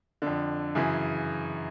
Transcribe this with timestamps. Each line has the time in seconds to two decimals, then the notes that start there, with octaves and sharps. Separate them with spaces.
0.22 F2 D3
0.75 F#2 C#3 E3 G#4